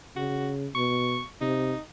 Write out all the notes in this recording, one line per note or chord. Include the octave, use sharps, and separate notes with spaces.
C#3 F#4
B2 C#6
C3 D#4